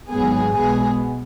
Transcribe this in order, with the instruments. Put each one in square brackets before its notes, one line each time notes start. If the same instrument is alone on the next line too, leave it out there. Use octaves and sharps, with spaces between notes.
[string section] G#1 G#2 F#3 B3 G#4
B1 B2 G#3 B3 G#4